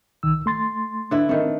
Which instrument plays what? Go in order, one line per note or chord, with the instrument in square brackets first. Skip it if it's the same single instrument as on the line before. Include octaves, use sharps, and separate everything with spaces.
[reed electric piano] C2 D#3 E6
A3 C6 A6
[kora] D3 E4 B4
[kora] D#3 A3 [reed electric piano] C4